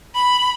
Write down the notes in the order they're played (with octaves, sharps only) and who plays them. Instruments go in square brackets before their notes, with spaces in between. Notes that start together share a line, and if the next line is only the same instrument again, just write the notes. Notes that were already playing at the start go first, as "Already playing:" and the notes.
[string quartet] B5